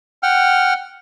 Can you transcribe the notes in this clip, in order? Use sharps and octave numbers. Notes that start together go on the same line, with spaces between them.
F#5 G5 F6